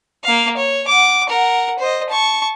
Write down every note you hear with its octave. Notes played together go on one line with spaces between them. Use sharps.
A#3 F5
C#5
F#5 D6
A#4 F#5
C5 D#5
A5 C#6